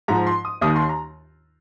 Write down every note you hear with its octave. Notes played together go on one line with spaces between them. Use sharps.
G#2 F3 A#5
C6
D#6
D#2 D#3 D#6
C6
A#5